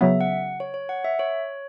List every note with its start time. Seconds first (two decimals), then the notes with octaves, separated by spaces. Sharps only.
0.01 C#3 F#3 B3 E5
0.21 F#5
0.60 C#5
0.74 C#5
0.89 F#5
1.05 E5
1.19 C#5